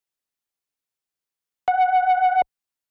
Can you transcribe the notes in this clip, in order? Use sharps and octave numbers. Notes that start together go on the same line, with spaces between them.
F#5